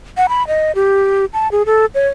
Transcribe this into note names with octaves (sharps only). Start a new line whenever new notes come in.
F#5
B5
D#5
G4
A5
G#4
A4
C#5